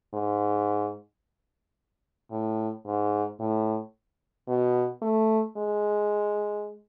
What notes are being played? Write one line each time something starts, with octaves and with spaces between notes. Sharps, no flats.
G#2
A2
G#2
A2
B2
A3
G#3